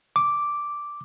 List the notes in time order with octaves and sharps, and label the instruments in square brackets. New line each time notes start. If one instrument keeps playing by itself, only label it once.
[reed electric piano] D6